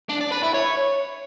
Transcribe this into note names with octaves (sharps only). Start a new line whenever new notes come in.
D4
D5
B4
E4
C#5